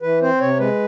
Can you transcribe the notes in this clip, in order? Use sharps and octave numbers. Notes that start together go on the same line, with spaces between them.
E3 B4
C4 C5
C3 C#5
G#3 B4